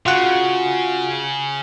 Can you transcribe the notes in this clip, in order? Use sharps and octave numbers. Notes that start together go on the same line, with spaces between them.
C#3 F4 F#4 F#5